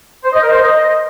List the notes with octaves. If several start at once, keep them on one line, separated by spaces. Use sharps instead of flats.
C5
D#5
A#4
C5
D#5